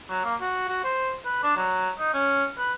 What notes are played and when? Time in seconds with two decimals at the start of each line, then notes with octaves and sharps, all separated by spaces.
0.10 F#3
0.25 A#3
0.41 F#4
0.69 F#4
0.84 C5
1.25 B4
1.43 D4
1.56 F#3
1.99 D#4
2.14 C#4
2.57 B4